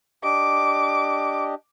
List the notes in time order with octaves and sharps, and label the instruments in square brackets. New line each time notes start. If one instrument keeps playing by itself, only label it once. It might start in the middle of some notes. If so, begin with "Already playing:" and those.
[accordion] D4 G4 D#5 [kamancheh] D6